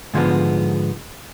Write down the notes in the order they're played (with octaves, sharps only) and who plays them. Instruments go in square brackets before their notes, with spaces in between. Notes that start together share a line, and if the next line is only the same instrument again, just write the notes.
[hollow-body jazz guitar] G#2 D3 F3 G#3 B3